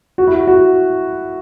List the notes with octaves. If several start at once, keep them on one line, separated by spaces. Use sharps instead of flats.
F#4
E4
F#4
F#4